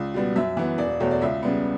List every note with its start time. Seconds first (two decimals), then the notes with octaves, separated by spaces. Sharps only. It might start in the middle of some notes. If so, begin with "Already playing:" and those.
Already playing: C#2 D5
0.14 B2 G3 B3
0.36 F#2 E5
0.57 E3 B3
0.78 E1 D5
1.00 E2 B2 A3 C#5
1.11 D5
1.21 C#2 E5
1.43 C#3 G3 B3